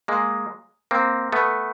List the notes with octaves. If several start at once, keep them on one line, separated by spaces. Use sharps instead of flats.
G#3 A#3
A#3 C4
A3 B3